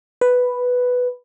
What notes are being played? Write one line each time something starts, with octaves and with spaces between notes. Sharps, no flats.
B4